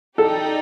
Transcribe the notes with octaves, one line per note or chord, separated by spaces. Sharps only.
D#4 G4 A4 D5 G5